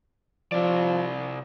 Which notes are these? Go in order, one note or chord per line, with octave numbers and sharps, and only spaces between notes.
C3 F3 D5